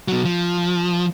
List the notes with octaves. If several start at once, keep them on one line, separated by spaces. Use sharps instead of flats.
B2 F#3
F3